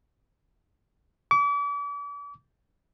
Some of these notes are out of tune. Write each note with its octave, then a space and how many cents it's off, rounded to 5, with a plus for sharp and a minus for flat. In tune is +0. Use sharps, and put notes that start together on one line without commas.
D6 -40